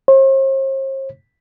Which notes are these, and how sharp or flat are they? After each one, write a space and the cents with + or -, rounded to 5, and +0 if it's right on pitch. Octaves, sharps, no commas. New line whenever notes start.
C5 +45